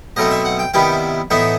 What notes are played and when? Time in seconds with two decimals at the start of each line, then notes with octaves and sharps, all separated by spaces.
0.16 B2 F#3 A3 C4 D#4 D#5
0.31 E5
0.45 F#5
0.59 G5
0.74 C3 D#3 G3 B3 E4 G5
1.31 A2 E3 B3 D#4 E5